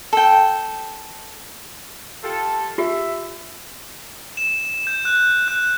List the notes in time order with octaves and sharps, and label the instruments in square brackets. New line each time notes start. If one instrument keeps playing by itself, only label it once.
[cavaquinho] A4 G5
[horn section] F4 G4 A4
[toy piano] F4 G4 [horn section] E5
[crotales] E7
G6
F#6
F#6